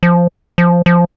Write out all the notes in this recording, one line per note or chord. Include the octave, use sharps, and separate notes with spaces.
F3
F3
F3